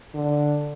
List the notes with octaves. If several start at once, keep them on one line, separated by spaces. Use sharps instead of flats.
D3